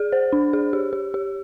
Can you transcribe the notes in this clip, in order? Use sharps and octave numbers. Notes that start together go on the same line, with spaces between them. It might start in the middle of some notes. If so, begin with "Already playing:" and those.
Already playing: G#4
C5
D4
G#4
G4
G4
G4